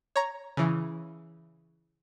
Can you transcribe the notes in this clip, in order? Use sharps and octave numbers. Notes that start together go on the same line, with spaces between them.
C#5 A#5
C#3 E3